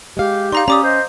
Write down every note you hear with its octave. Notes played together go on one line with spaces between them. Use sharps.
G#3 G4 F5
D#4 D5 F5 A#5 C6
C#4 G4 D5 A#5 D6 D#6
C5 D#5